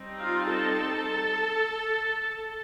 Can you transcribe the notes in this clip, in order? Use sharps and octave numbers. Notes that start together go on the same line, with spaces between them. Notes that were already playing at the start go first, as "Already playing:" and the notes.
Already playing: G3 C4 D#4
F4 F5
A4 A5